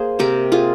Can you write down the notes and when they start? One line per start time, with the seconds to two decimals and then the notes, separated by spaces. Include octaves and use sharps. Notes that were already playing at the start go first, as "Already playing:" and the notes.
Already playing: A#3 G#4 C5
0.19 C3 G4 A#4
0.52 F4 G#4